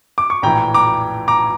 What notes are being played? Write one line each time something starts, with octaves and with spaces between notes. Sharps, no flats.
D6
C#6
A#1 A2 E3 G5 A#5
A#5 D6
A#5 D6